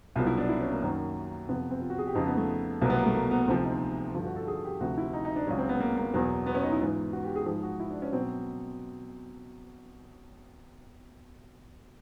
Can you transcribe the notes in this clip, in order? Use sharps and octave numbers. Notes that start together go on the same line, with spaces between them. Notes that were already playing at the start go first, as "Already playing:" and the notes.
C2 B2 F#3 F4
E4
D4
E4
C#4
A#3
F#2 D#3 F#3
F2 C3 F3 B3
C4
F4
F#4
G#4
G4
F2 C#3 F3 D#4
B3
A3
C2 B2 F#3 A#3
B3
A#3
A3
A#3
B3
D2 C3 F3 C4
D#4
G2 D3 F3 F4
F#4
A4
G#4
G4
D2 C3 F3 F#4
E4
D#4
D#4
D4
C#2 C#3 F#3 C#4
C4
B3
A#3
A#3
E2 B2 F#3
B3
C#4
D#4
E4
G#2 E3 F4
F#4
G4
G#4
G#2 F3 G#4
F#4
E4
D4
C#4
B2 F#3 C4